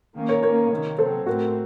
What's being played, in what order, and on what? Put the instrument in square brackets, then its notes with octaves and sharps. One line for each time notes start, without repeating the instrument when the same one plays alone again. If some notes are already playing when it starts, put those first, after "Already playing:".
[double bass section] D#3 A#3 C#4
[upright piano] A#4 C#5
[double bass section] D#3 A#3 C#4 [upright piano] A#4 C#5
[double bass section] C3 D#3 A#3
[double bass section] C3 F#3 C4 [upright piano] A4 C5
[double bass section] A2 A3 C4 [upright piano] F#4 A#4